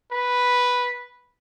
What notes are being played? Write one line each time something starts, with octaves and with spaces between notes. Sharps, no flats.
B4